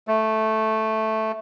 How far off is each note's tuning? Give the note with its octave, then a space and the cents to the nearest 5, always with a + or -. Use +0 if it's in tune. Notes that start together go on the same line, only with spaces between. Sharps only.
A3 -5